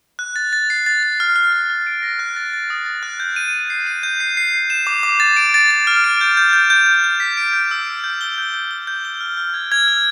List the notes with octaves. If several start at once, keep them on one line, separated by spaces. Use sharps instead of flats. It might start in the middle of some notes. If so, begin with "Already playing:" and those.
F#6
A6
A6
C7
A6
A6
F6
F6
F6
F6
D7
A#6
F#6
A6
A6
D#6
A6
F#6
G6
D#7
D#7
C7
D#7
G6
C7
C7
C7
E7
D6
D6
A6
D7
A6
A6
F6
D7
G6
G6
G6
G6
G6
G6
B6
D7
G6
E6
D7
G6
G7
G6
G6
G7
G6
G7
F6
F6
G#6
G#6
F6